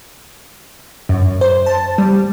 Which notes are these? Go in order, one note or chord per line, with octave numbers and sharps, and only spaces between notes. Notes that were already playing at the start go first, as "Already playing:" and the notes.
F#2
C5
A5
G3